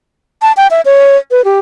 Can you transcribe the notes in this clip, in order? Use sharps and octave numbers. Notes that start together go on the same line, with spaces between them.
A5
G5
E5
C#5
B4
G4